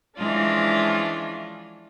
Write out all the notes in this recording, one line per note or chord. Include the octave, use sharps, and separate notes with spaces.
E3 F3 G#3 C#4 D4 F4